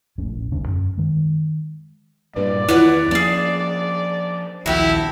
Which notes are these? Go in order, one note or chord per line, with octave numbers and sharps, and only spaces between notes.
E1 A#1 A2 C#4
D#1 C2 D3 C#4
F#2
D#3 G#3
G2 A#2 B4 D5
E2 D#3 E4 F4 B4 C#5 F#5
F3 A#3 C#4 D4 G#4
A#1 D#2 F3 E4 F#4 G4 A4